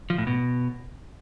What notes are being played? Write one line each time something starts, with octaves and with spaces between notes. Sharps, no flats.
F3
A2
B2